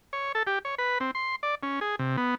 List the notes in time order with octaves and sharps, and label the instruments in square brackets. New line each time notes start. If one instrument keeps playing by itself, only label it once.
[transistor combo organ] C#5
A4
G4
C#5
B4
C4
C6
D5
C#4
G#4
C3
B3